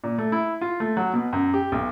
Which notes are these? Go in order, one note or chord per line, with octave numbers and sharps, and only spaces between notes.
A#2
A3
E4
F4
A3
F#3
B2
F#2
G4
B1